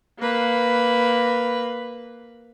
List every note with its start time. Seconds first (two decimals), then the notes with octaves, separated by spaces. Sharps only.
0.19 A#3 B4